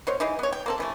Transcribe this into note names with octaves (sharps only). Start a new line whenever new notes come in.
B2 C5 C#5
E3 D#4 G#4
B3 C#5
G5
A#3 C4 A4
C3 E3 A3